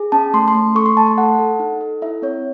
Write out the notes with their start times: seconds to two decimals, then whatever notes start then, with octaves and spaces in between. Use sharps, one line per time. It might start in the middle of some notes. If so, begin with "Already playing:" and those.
Already playing: G#4
0.12 C#4 A5
0.33 A3 C6
0.48 C6
0.55 A3
0.75 A4 C#6
0.86 C6
0.96 A3 A5
1.07 A5
1.18 A4 F#5
1.39 A4
1.60 D#4
1.81 A4
2.02 E4 E5
2.22 C4 C#5